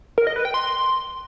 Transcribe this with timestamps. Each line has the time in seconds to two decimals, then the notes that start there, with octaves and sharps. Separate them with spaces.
0.18 A#4
0.27 D#5
0.36 B4
0.45 G5
0.54 C6